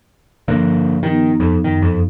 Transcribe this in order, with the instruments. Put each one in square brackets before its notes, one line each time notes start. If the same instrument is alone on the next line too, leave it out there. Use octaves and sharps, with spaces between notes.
[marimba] G2 F3 [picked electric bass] D3 A#3
[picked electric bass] D#3 [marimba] B3 D#4 G4
[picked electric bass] F2
[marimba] F#2 [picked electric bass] D#3
[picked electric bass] F2